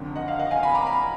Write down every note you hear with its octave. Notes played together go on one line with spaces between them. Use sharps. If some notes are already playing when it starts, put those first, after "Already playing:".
Already playing: F#1 F2 D3
D#5 F#5
F5
D#5 F#5
F5 G#5
G#5 B5
A#5 D6
G#5 B5